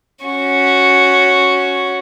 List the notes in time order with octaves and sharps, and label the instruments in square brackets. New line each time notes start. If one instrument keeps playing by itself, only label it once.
[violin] C#4 F#4